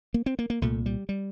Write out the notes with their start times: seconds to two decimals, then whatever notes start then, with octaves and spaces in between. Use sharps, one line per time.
0.14 A#3
0.26 C4
0.39 A#3
0.50 A#3
0.62 C2 A#2 A3
0.86 G3
1.09 G3